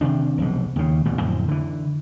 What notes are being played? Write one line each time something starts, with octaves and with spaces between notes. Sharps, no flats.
C3 D#3 D4
F1 B1 G#2
D#2 C#3
A1 G2 B2
F2 A2 D3 F#3
D3 E3